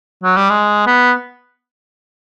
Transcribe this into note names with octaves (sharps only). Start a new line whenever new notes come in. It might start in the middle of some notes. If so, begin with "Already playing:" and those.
F#3
G3
G#3
B3